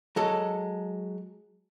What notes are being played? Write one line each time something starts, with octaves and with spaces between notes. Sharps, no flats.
F#3 G#3 A4